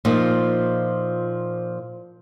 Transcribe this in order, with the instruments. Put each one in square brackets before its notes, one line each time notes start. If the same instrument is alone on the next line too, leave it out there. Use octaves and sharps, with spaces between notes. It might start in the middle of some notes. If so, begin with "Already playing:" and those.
[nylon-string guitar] A#2 F3 D#4